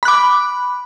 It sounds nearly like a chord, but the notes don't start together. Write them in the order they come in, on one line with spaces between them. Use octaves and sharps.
B5 F#6 D6